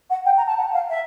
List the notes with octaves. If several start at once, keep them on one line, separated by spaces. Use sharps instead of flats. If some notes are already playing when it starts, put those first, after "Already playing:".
F#5
G5
A#5
A5
F#5
F5
E5